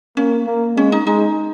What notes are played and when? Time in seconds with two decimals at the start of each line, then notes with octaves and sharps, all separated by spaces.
0.17 A#3 C#4
0.47 A#3
0.77 G#3 C#4
0.92 D#4
1.06 G#3 D#4